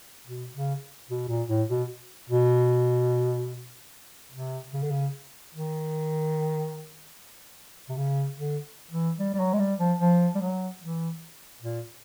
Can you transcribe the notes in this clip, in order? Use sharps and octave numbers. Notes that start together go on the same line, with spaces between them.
B2
C#3
B2
A#2
A2
B2
B2
C3
C#3
D3
C#3
D#3
C3
C#3
D3
E3
G3
G3
F#3
G#3
G3
F3
F3
G3
F#3
E3
A#2